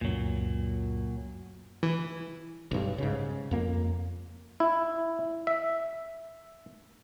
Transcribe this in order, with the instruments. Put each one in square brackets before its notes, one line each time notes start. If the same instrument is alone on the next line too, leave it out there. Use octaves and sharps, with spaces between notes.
[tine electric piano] C#2 F#2 [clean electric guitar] A#2 F#3
[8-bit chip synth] E3
[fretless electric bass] B1 G2
G#2 C#3
F2 A#3
[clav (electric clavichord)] E4
E5